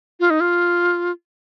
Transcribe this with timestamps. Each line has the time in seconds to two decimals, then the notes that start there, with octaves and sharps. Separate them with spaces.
0.20 F4
0.30 D#4
0.41 F4